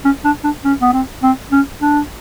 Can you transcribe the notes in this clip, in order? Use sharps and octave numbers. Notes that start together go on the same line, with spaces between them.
C#4
D4
D4
C#4
B3
C4
C4
C#4
D4